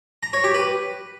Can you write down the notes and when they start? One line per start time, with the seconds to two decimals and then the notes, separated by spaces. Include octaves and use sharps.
0.23 A#5
0.33 C#5
0.44 G4
0.54 B4